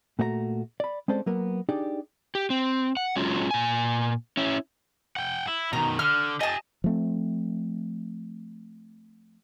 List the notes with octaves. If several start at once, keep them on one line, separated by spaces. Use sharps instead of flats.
A#2 A3 F#4 C#5 A#5
D5 B5
G#3 C4 C#4 A4 C5 D5
F#3 A#3 B3 A#4
D4 D#4 G4 G#4 D5
G4
C4
F#5
F#3 G#3 C#4 F4
A#2 G#5
C#4 E4
F#5 G5
E4
B2 D#3 A#5
D3 F6
G4 D#5 G#5 A5
F3 A3 C4